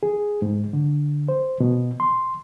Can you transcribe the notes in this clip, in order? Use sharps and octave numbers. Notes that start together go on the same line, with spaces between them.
G#4
G#2
D3
C5
B2
C6